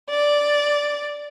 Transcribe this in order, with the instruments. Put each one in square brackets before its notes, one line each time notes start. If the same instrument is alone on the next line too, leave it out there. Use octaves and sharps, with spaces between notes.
[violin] D5